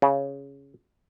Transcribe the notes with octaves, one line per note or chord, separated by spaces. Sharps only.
C#3